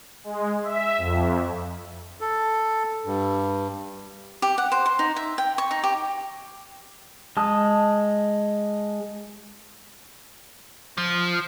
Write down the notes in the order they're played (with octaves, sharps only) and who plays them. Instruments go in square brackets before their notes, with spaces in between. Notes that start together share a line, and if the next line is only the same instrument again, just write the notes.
[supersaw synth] G#3
E5
F2
[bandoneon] A4
G2
[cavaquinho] G4
F#5
C5
C6
D#4
E5
G5
C#6
D#4
G4
[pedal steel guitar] G#3 A5 D#6
[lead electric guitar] F3